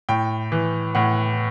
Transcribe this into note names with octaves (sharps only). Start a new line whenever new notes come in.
A2 G5
E3
A2 F#5